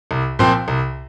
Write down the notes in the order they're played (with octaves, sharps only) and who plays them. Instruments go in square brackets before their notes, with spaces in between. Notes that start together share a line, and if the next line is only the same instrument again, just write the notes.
[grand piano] C2
A#2 F3 C4
C2